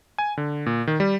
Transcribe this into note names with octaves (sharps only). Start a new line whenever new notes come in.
G#5
D3
A#2
D#3
G3